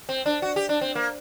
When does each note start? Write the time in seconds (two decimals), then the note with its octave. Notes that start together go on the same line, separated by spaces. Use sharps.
0.09 C4
0.26 D4
0.42 F#4
0.56 G4
0.69 D4
0.81 C4
0.95 A#3